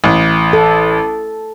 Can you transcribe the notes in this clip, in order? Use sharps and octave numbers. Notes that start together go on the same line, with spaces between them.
A1
A4